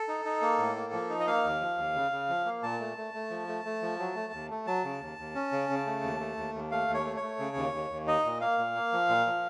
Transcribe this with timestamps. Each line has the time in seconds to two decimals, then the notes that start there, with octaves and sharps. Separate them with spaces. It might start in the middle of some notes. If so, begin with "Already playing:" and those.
Already playing: A4
0.08 D#4
0.25 D#4
0.42 A#3
0.58 A2
0.76 A#3
0.93 F3
1.10 D#4
1.20 D#5
1.27 A#3 F5
1.44 D#2
1.61 F3
1.78 D#2
1.95 C#3
2.12 C#3
2.29 F3
2.46 A#3
2.63 A#2 A5
2.80 A3
2.97 A3
3.14 A3
3.30 F3
3.48 A3
3.65 A3
3.82 F3
3.99 F#3
4.16 A3
4.33 D#2
4.50 A3
4.67 F#3 A5
4.84 C#3
5.01 D#2
5.18 D#2
5.35 C#4
5.52 C#3
5.69 C#3
5.86 A3
6.03 D#2
6.20 A3
6.37 D#2
6.54 D#2
6.71 A3 F5
6.88 D#2
6.94 C#5
7.05 A3
7.16 C#5
7.22 A3
7.39 C#3
7.56 D#2
7.73 D#2
7.90 D#2
8.07 D#4 D#5
8.25 A#2
8.41 A#3 F5
8.58 A#2
8.75 A#3
8.92 F3
9.09 A#2
9.26 F3